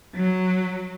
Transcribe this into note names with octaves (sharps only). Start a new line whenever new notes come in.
F#3